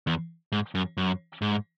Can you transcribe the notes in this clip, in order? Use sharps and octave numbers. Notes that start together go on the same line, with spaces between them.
E2
G#2
F#2
F#2
G#2